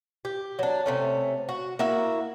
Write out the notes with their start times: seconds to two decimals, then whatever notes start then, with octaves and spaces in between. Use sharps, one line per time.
0.25 G4
0.59 F#3 D4
0.86 C3 A3 C#4
1.49 F#4
1.79 A#3 E4 F#4 E5